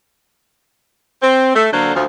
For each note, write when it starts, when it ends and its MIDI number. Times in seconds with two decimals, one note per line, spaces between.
1.22 1.51 60
1.55 1.68 57
1.73 1.94 50
1.73 1.94 54
1.73 1.94 58
1.73 1.94 62
1.73 1.94 69
1.73 1.94 72
1.94 2.04 38
1.94 2.04 53